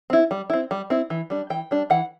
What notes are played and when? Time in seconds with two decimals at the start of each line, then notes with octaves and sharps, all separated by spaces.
0.10 C4 E4
0.31 G3
0.50 C4 E4
0.71 G3
0.90 C4 E4
1.10 E3
1.30 G3 D4
1.50 E3 G5
1.71 G3 D4
1.90 E3 F#5